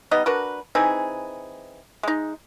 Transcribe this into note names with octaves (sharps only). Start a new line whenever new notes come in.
G3 B3 D#4 D#5
D4 F#4 A#4 B4
E3 C4 D#4 G#4
G#3 D#4